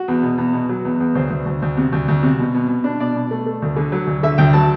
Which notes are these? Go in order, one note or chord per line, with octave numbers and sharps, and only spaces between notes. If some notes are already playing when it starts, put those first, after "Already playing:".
Already playing: F#4
E2
B2
E2
B2
F#3
E2
E2
D2 C5
D2
D2
D2
C3
D2
D2
C3
B2
B2
B2
D4
B2 D5
B2
A3
A3
D2
D3
F#3
D2
D3 E5
D2 G5
F#3 A5